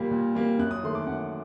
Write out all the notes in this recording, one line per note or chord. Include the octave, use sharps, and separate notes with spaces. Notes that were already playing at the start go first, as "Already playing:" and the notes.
Already playing: A#2 G3 A#3
A#2
G3 A#3
F#2 F#6
D#6
D#3 A3 C6
D6
F#2 F#5